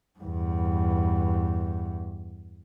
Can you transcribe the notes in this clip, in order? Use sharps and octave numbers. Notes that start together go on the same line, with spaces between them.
E2 G2